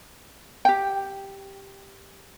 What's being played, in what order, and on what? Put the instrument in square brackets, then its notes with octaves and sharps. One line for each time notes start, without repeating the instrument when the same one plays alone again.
[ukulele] G4 G5